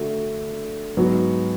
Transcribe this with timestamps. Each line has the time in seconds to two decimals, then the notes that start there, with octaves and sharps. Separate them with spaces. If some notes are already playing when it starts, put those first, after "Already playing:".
Already playing: D3 A3 D4 F#4
0.97 G#2 F#3 B3 F#4